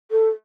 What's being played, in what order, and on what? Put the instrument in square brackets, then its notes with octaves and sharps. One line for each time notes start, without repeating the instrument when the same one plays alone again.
[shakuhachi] A4